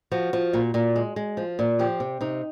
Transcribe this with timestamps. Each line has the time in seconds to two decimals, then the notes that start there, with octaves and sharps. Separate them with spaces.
0.12 F3 F#4
0.33 F3
0.53 A#2
0.74 A#2
0.96 G#3
1.16 G#3
1.37 F3
1.59 A#2
1.79 F3 G4
2.00 C3
2.21 C3 D#4